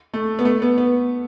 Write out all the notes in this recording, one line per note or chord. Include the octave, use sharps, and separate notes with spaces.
A3
B3
A3
B3
B3